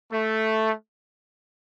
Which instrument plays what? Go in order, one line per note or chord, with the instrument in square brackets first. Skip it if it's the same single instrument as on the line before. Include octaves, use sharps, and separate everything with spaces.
[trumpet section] A3